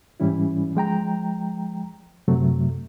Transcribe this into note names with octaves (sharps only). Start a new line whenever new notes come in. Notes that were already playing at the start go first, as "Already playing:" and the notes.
G#2 E3 G3 C#4 E4
F3 G#3 G5 A#5
F#2 C3 F#3 A3